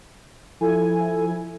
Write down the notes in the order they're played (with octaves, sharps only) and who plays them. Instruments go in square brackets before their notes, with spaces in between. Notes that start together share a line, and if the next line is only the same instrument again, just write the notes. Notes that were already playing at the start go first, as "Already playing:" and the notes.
[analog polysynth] F3 E4 G#5 [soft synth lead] A4